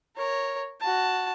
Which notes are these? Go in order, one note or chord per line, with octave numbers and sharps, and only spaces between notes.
A#4 C#5
F#4 A5